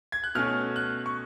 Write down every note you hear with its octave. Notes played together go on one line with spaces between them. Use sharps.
G#6
F#6
B2 A3 C#4 F6
F#6
C#6